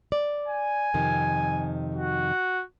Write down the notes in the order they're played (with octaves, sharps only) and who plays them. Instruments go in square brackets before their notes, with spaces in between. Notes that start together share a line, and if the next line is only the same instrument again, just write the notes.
[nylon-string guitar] D5
[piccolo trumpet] G#5
[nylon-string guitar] F2 C3 D#3
[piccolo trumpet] F#4